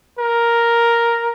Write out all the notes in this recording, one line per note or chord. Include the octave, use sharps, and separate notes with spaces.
A#4